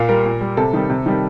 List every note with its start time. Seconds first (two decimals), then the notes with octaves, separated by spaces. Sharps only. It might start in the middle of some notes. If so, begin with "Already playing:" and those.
Already playing: A#2 F5
0.09 G3 A#4
0.26 A#2
0.41 G3
0.57 C3 A4
0.73 D#3 G3
0.89 C3
1.06 D#3 G3